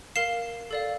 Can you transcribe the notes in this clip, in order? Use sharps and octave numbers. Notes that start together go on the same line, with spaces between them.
A#4 F5 C7 E7
A4 D5 F5